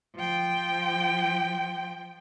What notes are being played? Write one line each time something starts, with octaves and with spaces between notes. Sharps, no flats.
F3 G5